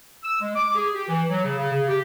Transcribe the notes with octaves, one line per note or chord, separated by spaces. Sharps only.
E6
G#3
D6
G#4
G4
E3
F#3
C#3
C#3
C#3
G4